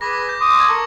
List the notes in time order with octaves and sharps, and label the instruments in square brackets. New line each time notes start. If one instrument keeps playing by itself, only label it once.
[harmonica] G#4 B4 G#5 [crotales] D6 A#6
[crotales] G6
[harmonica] C6 D6 D#6
[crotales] C#6 E6 G#6
[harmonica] A4 A#4